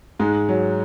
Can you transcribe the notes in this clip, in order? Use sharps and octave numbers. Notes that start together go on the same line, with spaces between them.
G#2 G#3
F#3